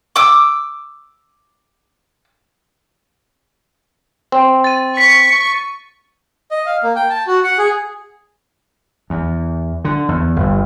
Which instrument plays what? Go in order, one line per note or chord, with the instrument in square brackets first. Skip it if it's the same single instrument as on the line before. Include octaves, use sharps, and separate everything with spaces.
[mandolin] D6 E6
[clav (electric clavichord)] C4
[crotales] A6 D#7
[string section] C#6 [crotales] B6
[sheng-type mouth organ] D#5
F5
A#3
G5
A5
F#4
F#5
G#4
[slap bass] E2
D3
E2
G1